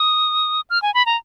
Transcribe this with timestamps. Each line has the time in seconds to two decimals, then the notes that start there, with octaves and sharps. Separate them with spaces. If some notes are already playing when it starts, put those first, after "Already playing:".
Already playing: D#6
0.70 F6
0.82 G#5
0.94 B5
1.06 A#5